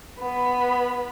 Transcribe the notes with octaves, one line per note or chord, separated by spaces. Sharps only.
B3 B5